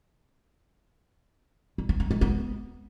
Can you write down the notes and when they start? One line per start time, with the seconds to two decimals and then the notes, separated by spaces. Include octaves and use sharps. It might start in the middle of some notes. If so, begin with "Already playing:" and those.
1.78 G3
1.89 B3
2.00 D#4
2.11 G#3
2.21 B3